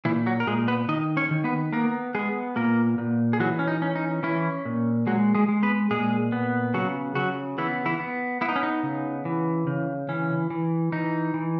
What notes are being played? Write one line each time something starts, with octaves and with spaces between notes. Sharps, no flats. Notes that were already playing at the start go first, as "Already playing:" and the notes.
A#2 E3 E4
F#3 F#4
A#4
A#2 G#3 G#4
B3 B4
D#3 D#4 D#5
C#4 C#5
D#3
B3 B4
A#3 B3 A#4
G#3 B3 G#4
A#2 A#3 A#4
A#2
G#4
E3 F#3 F#4
C#4
D#4
C#4
D#4
E3 C#4 E4
A#2
F#3 G#3 F#4
G#3 G#4
G#3
B3 B4
A#2 G#3 G#4
B3
C#3 F#3 F#4
C#3 F#3 F#4
E3 B3 E4
E3 E4
B3
B3 E4
D#4
C#4
D#4
C#3
E3
C#3
E3 C#4
E3
E3 D#4
E3